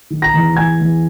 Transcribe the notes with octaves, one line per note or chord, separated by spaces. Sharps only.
D#3
A#5 A#6
E2
E2 G#5 G#6
E2